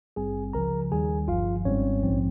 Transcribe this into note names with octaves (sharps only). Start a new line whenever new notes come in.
G#1 G2 G3 C4 G#4 G#5
C#2 C#3 F3 A#4 A#5
D#2 D#3 G3 G#4 G#5
G1 G2 F3 F4 F5
G#1 G#2 G3 C4 C#4 C#5
A#1 G#2 F3 C4